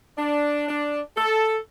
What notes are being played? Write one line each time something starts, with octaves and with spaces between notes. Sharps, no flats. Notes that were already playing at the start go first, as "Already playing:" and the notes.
D4
D4
A4